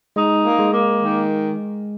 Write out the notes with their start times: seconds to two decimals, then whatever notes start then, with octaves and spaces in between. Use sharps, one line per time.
0.16 G#3 D#4
0.44 A#3
0.59 G#3
0.73 A#3
1.01 D#3